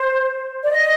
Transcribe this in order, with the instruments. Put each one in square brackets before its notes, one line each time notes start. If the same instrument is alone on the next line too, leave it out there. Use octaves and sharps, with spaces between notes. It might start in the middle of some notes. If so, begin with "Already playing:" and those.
Already playing: [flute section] C5
D5
D#5